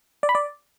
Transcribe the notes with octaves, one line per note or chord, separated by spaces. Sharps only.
D5
B5
D5